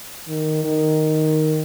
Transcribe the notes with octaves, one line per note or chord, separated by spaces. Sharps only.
D#3
D#3